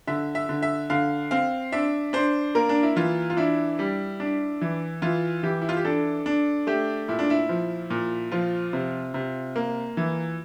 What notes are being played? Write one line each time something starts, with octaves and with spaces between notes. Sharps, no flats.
D3 E5
E5
D3
E5
D3 F5
C4 F5
D4 E5
D4 C5
A#3 A#4
D4
E4
E3 F4
F4
D4 E4
G3
D4
E3
E3 F4
E3 G4
E4
F4
G4
D4 A4
D4
A3 G4
A#2 E4
D4
E4
F3
A#2
F3 F4
C3
C3
A#3
E3